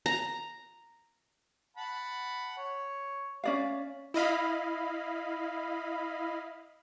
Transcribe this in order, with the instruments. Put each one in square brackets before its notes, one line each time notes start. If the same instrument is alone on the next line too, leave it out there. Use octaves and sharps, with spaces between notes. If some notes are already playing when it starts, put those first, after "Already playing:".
[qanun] A#5
[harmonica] F#5 A5 B5
C#5
[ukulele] C#4 D5 F5
[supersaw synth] E4 D#5 F5 B5